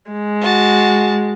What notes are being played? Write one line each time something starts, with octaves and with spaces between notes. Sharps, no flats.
G#3
F#4 A5